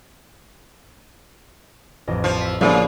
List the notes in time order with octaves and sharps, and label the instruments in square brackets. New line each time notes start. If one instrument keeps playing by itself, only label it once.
[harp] A1 F2 A#6
[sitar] F3
[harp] E6 B6
[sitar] C#3 [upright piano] F3 A#3 D4 [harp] B3 G4 D#6